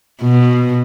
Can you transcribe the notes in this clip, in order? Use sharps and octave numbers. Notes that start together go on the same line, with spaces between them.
B2